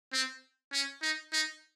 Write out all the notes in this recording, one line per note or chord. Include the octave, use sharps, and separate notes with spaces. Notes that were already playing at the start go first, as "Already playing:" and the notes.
C4
C#4
D#4
D#4